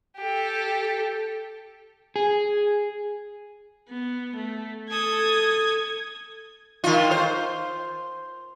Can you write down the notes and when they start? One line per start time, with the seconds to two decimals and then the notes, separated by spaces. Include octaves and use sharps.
0.18 G4 A4
2.16 G#4
3.89 B3
4.36 A3
4.91 A4 D#6 G#6
6.84 D#3 F4
7.11 C5